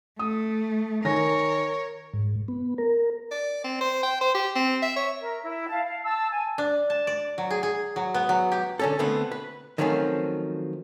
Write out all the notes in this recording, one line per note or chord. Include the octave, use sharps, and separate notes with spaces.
A3 D#6
D#3 A#4 C#5 G#5 A#6
G#2
B3
A#4
D5
C4
C5
G5
C5
G4
C4
E5
C#5
A#4 E5
E4
F5 A5
F5
A5 E6
G#5
D4
A5
D5
F#3
G#4
G#4
F#3
B3
F#3
G4
D3 C#4 A4
D3 A3 B3 C4
B4
D#3 F3 F#3 A3 C4 C#4